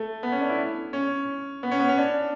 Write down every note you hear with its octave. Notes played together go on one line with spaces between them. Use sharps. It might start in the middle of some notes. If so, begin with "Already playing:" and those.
Already playing: A3
B3
C#4
D4
E4
C#4
B3
C#4
B3
C#4
D4